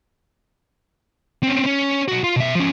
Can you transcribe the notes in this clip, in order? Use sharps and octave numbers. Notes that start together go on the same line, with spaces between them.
C4 C#4
C#4
B1 F#4
F4
B2 E5
F3 C#4